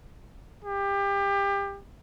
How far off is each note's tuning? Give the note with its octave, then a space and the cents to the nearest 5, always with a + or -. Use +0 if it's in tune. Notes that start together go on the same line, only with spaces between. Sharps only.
G4 +25